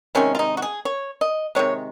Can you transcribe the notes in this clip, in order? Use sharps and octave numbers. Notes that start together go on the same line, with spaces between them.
C3 D#3 G#3 C#4
F4
D#4
F#4
G#4
C#5
D#5
C3 D#3 G#3 C#5